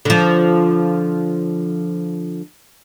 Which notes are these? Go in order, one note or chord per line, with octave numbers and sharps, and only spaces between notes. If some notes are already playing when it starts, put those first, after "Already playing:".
D3 F3